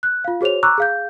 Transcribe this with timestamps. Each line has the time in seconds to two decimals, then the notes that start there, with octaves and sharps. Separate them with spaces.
0.03 F#6
0.25 F4 F5
0.41 F#4 G#4 C5 C#5 F7
0.63 A#5 C#6 D6 E6 F#6
0.78 G#4 F5 G6